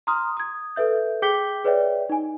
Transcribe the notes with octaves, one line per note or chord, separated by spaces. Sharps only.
A#5 C6 D#6 F6
D#6 G#6
A4 B4 E5 G6
G#4 G5 D6 G6 B6 G7
G#4 B4 C#5 D5 E5 G5
D#4 G#5